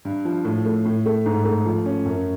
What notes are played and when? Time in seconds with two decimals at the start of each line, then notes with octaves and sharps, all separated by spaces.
0.05 G2
0.25 F3
0.45 A2
0.65 A3
0.86 A2
1.06 A3
1.26 G#2
1.45 A3
1.65 F3
1.85 C#4
2.05 F#2